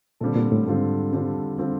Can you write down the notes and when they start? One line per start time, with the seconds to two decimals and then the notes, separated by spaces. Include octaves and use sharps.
0.21 A#2 D3 G3 C4 F4 A4
0.36 A#2
0.52 A2
0.67 G#2 D3 G3 C4 F4 A4
1.13 D3 G3 C4 F4 A4
1.58 D3 G3 C4 F4 A4